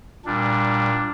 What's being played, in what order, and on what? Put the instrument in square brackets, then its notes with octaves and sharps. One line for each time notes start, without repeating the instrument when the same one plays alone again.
[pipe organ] A#2 G3 D4